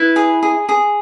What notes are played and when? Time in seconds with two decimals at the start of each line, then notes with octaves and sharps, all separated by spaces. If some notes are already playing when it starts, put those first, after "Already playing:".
Already playing: E4 B4 B5
0.16 G#4
0.43 G#4
0.69 G#4